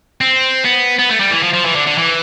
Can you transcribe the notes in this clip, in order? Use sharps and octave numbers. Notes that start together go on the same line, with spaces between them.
C4
B3
B3
A3
G3
E3
F3
F3
E3
D3
D3
E3